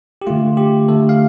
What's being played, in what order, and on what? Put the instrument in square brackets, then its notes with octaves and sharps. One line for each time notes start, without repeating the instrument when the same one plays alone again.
[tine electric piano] G4
D3 A3 F4
G4
D3 A3 A4
F5